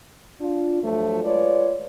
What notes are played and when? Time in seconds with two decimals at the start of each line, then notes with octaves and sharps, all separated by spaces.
0.40 D4 F4
0.83 G2 F3 F#3 A3
1.23 G#3 F4 B4 C#5 D5